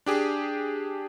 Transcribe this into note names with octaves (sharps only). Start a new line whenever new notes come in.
D4 G4 G#4